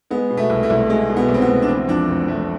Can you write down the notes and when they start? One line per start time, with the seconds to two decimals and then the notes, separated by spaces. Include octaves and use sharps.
0.11 G#3 B3
0.30 B2
0.37 A3
0.50 C2
0.63 A3
0.70 C2
0.90 G#3
1.09 B2
1.17 B3
1.29 C2
1.34 C4
1.42 B3
1.48 C2
1.62 D4
1.68 E3 C4
1.88 F2 D4
2.08 F1 C4
2.28 F1 A3